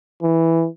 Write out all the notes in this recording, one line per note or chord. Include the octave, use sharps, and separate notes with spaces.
E3